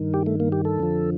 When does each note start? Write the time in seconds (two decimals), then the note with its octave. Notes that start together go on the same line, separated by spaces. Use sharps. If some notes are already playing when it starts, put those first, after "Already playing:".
Already playing: G2 D#3
0.14 G4
0.26 A3
0.40 A#3
0.52 G4
0.65 A4
0.79 F2 D3 F3